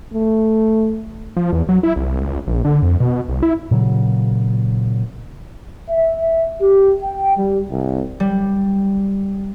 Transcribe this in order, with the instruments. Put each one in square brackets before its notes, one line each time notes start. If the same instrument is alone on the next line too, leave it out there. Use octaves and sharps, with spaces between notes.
[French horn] A3
[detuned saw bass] F3
E2
F#3
E4
C2
C#2
A#1
D3
F2
B2
C2
E4
[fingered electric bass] A#2 C#3 F#3
[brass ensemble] E5
G4
G5
G3
C2
[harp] G3